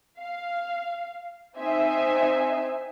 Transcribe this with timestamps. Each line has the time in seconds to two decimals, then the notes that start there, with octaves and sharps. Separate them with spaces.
0.18 F5
1.57 C4 D#4 C5 E5 G#5